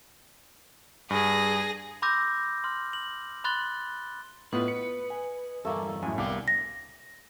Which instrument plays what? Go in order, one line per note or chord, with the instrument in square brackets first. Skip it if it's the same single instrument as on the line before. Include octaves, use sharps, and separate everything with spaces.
[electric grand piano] G2 [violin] G#4 A#6
[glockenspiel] B5 C6 D6 E6 G6 A#6
C6 F6
F#7
B5 C6 F#6 A6 G7
[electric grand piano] A2 B3 F4 [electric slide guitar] B4 [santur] D#5
[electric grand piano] C#7
[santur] G#5
[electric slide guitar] E2 G2 G3 [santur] A3 A#3
[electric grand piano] F#2 A2 [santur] G#5
[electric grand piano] C2 F5 D6 [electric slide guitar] B3 D5 G5 [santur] D4
[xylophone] A#6